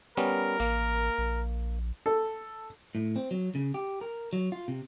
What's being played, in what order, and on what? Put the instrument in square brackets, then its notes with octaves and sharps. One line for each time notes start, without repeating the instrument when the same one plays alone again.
[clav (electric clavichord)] G3 B3 C#4 [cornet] A#4
[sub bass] A1 [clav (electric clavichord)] A#3
[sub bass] A#1
[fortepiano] A4
[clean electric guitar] A2
C4
F#3
C#3
G4
A#4
F#3
F4
C3